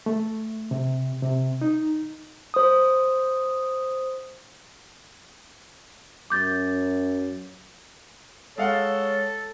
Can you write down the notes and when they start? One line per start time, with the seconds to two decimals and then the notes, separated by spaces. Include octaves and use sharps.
0.06 A3
0.71 C3
1.22 C3
1.61 D#4
2.54 C5 D#6
6.30 F#2 D6 G6 A6
8.58 G#3 A4 C#5 F5 F#5